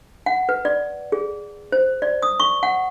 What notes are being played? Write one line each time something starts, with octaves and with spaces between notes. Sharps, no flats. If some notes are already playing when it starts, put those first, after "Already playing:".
F#5
B4
D5
G#4
C5
D5
D#6
C#6
F#5